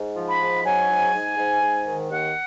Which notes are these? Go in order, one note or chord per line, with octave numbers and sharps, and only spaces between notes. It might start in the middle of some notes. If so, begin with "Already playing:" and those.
Already playing: G#2
F3
B5
G#2
F#3 G#5
G#2
G#2
G#2
G#2
D#3
D#2 F#5